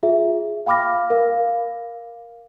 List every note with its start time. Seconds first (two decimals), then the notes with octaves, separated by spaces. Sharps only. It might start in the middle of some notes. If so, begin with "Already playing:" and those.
0.03 F4 G#4 E5
0.66 F5 G5 B5 D6 F6 A#6
1.10 A#4 F5